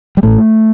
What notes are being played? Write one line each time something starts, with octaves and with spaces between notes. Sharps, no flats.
G3
A1 A2 A3